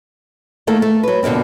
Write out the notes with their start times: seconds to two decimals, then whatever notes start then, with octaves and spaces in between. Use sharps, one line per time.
0.67 D#3 A3 A#3 A4
0.82 A3
1.03 F#3 B4
1.23 F2 B2 D3 A#3 C4